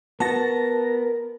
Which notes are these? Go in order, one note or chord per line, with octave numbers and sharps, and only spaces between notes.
B3 F#4 A#4 A5 A#6